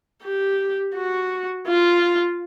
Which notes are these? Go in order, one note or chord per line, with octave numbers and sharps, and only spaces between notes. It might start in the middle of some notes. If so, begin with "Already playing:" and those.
G4
F#4
F4